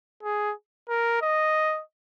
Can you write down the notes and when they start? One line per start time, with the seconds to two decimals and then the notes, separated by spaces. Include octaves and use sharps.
0.23 G#4
0.89 A#4
1.21 D#5